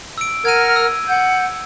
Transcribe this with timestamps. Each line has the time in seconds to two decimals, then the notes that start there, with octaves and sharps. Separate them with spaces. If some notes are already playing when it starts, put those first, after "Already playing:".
0.18 E6 D7
0.45 A#4 F#5 F6 G#6 D#7
0.76 E6
1.07 F#5 G6